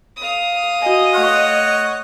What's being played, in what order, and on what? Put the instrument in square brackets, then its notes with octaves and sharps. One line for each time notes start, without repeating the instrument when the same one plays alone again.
[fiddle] F5 D#6
[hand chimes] F#4 G#5 [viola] D#5
[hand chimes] A3 C6 F6 [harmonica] C#5 F#5